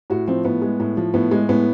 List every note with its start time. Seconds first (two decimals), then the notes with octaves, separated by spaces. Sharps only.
0.10 A2 F#4
0.28 F3 C4
0.45 A2 B3
0.62 G#3
0.80 A2
0.97 F3
1.14 A2 B3
1.31 G#3
1.49 A2 B3